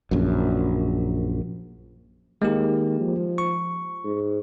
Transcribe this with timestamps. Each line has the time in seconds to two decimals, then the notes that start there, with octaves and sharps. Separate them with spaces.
0.11 A#1 F#2
2.42 D#3 G#3 A#3 G4
3.00 F3
3.38 C#6
4.05 G#2